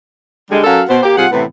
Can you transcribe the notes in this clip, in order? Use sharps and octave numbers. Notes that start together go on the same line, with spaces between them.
D3 G3 G#3
F#3 C#4 F#4 A4 A#4 F5
B2 B3 C5
A#3 G4
C3 G3 F4 G#4 F#5
A2 C3 E3 B3